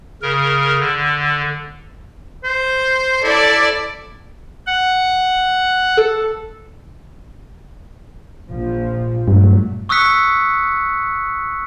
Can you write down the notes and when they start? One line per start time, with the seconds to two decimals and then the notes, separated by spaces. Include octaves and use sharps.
0.22 C#3 A#4
0.80 D3
2.44 C5
3.24 E4 A4 D5
4.67 F#5
5.97 A4
8.49 A#1 F3
9.28 G2 A#2 F#3 A3
9.89 C#6 D#6 E6 F#6 B6 C#7